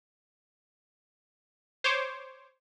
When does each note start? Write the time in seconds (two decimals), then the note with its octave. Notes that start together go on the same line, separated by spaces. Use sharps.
1.84 C5 C#5 D6